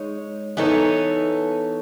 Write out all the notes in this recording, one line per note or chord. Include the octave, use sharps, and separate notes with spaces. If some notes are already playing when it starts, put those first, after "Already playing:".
Already playing: G#3 D#4 C#5
E3 B3 D#4 A4 C#5